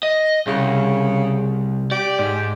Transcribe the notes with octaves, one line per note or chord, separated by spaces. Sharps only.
D#5
C2 C#3
G4 D5
G#2